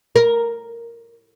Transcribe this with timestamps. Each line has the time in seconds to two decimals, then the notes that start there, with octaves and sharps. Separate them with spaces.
0.16 A#4